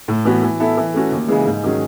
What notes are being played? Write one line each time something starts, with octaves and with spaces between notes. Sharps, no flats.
A2
E3 B3 F#4
E3
B3 E4 A4
E3
A3 C#4 F#4
D#2
C#3 E3 G#3
G#2
D#3 F#3 C#4 G#4